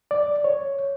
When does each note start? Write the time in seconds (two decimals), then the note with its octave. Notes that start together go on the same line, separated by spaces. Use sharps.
0.11 D5
0.44 C#5